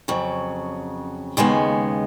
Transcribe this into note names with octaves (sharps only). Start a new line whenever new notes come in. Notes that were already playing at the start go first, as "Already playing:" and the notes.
F2 C#3 F#3
D#2 C#3 G#3 B3